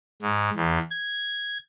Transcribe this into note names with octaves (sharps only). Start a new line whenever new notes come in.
G#2
E2
G#6